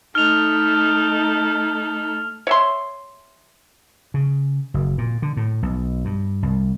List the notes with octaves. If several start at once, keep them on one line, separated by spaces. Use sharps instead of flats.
A3 D#4 A4 F6 F7
C#5 E5 C6
C#3
F#1
A#2
D3
A2
B1
G2
C2